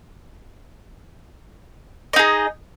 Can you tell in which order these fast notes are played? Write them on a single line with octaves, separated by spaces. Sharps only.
D#5 D#4 G#4